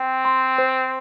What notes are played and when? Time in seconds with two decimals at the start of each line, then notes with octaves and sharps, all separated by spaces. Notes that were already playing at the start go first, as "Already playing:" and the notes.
Already playing: C4 G5
0.25 C6
0.58 C5